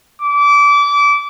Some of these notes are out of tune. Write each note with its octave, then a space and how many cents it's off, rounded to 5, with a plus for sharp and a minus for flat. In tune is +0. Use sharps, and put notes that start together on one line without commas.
D6 -25